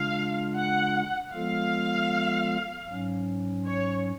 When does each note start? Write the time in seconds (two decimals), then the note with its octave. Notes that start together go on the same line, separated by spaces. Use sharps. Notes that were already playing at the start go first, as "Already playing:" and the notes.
Already playing: C#3 G#3 D4 F4 F5
0.56 F#5
1.33 F3 G#3 B3 F4 A4 F5
2.88 G#2 F#3 C#4
3.66 C#5